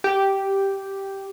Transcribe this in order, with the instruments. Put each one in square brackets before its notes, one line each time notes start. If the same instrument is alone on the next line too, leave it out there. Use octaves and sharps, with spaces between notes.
[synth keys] G4